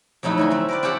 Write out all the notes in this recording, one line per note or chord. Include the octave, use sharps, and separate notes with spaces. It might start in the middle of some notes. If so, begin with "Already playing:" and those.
F2 F#3 A3 D#4 E4 E5
D3 F#4 G#5
C4 E5
A#4 B4 D5
C4 C#4 F4 G4 F#5